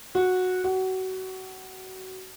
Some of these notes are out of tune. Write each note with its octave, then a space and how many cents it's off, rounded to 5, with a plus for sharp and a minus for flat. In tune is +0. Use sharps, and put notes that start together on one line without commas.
F#4 -10
F#4 +25